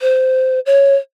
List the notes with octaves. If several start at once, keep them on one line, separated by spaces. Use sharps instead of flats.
C5
C#5